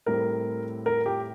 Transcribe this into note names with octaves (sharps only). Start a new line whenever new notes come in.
A2 G3 C4 A#4
A#4
G4